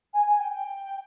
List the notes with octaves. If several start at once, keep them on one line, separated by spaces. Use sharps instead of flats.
G#5
G#5
G5
G5